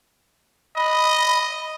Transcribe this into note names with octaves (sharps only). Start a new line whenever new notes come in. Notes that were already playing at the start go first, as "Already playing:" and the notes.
D#5 B5